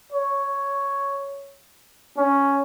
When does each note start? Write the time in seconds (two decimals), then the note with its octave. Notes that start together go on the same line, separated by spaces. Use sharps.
0.12 C#5
2.17 C#4